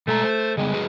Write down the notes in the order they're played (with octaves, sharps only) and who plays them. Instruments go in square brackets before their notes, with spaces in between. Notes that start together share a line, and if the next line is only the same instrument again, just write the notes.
[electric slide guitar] B2 G#3 A#5 [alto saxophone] A3
[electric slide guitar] C5
[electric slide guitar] C#3 G3 B3 [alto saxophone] G#3
[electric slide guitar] F#3 G#4 B4